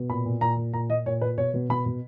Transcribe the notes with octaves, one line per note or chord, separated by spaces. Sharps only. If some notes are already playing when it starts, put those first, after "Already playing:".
Already playing: B2
A#2 B5
A#2
A#2 A#5
A#2
A#2 A#5
A#2 D#5
A#2 C#5
A#2 B4
B2 C#5
B2
B2 B5
B2